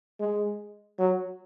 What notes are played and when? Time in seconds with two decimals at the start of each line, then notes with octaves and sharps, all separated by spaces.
0.20 G#3
0.99 F#3